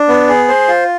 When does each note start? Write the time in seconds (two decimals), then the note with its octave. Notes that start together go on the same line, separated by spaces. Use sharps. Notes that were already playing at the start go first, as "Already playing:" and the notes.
Already playing: D4
0.08 B3
0.29 G#4
0.48 C5
0.68 F4